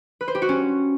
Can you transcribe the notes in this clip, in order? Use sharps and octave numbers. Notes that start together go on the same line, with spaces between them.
B4
C5
G4
F#4
C#4